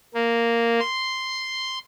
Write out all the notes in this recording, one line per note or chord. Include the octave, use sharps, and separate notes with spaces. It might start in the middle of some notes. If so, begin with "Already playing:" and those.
A#3
C6